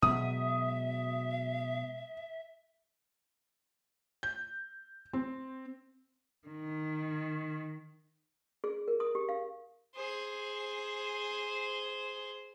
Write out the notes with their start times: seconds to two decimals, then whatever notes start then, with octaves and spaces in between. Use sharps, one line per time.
0.02 B2 F#3 G#3 E5 D#6
4.23 G6
5.13 C4
6.48 D#3
8.64 G#4
8.88 A#4
9.00 D#6
9.15 G4
9.29 F5
9.95 G#4 C5